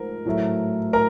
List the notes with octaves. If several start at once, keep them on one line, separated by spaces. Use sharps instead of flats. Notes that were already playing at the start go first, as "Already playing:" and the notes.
Already playing: G#2 F3 A3 A#4
A2 F#3 A3
A#4 A#5